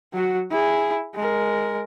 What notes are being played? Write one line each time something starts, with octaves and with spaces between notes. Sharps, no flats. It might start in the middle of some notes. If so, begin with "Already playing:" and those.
F#3 F#4
E4 G#4
G#3 A#4